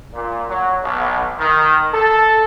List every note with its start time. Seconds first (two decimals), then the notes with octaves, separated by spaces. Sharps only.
0.12 A#2
0.48 F#3
0.81 B1
1.38 D#3
1.92 A4